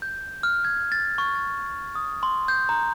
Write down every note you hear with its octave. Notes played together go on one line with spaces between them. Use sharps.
G6
F6
G#6
A6
C#6
A6
D#6
C6
G6
A#5